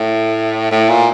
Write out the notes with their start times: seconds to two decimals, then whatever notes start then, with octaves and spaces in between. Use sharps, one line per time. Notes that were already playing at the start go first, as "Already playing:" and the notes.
Already playing: A2
0.71 A2
0.89 A#2